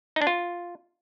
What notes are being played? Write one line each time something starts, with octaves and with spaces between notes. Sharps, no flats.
D#4
D4
F4